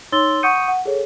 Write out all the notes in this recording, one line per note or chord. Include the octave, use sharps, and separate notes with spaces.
D#4 C#5 C6 E6 A6 G7
F#5 C#6 D#6 G6 C#7 D#7
F#5
G#4 A4 C#5